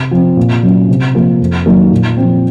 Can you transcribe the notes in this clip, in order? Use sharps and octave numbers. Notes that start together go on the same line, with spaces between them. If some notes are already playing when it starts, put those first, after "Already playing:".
Already playing: C3
F3 C4
A#2
F#3 C#4
C3
F3 A#3
F2
D#3 F#3 A#3
A#2
F3 C4